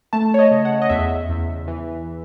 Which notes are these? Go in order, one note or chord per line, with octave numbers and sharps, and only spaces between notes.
A3 A5
C#5
D#5
C#3
F#5
D#5
E2 E5
E2
E3